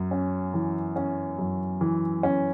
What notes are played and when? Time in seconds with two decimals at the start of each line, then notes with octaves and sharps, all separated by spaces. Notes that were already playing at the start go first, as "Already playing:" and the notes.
Already playing: F#2
0.11 C#4
0.54 E3
0.96 C#4
1.39 F#2
1.81 E3
2.23 C#4